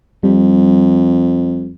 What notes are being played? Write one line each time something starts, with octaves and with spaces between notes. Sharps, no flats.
F2 G3